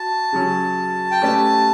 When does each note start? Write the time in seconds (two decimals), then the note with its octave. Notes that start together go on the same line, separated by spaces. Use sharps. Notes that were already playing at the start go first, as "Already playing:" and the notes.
Already playing: F#4 A5
0.33 C#3 F#3 C#4
1.11 G5
1.22 A3 C#4 G4 B4 D5 A5